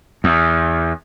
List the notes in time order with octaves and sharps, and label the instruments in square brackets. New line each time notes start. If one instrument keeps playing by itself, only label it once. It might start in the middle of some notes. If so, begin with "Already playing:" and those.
[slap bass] E2